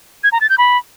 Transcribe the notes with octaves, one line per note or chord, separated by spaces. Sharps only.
G#6
A#5
A6
G6
B5